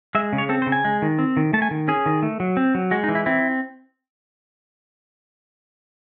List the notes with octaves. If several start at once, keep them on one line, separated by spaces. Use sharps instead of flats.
G#3 E5
C#3
C#5
C4 A4
C5
C#3
G#5
G#3
D#3
C4
D#3
A3 A5
G#5
D#3
C#4 G#4
D#3
A3
F#3
C4
F#3
G#3 F#4
D#4
E3
E4
C4 E4